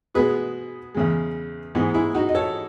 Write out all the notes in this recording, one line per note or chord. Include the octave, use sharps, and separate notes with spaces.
B2 G#3 B3 G#4 B4
E2 C#3 G#3
G#2 E3 G#3 B3
E4 G#4
D#4 F#4
D#5
A4 C#5